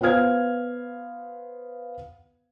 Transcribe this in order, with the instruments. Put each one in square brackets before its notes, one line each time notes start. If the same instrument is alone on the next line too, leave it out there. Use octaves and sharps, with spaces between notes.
[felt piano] B3 C5 F5 F6 G#6